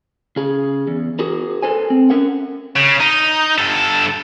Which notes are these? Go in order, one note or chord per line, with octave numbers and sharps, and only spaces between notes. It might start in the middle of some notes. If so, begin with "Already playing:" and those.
C#3 G#4
E2
F#4 G#4 A#4
A4 B4 C5 G#5
C4
C#4 A#4 F#5
C#3
D#4
G2 A4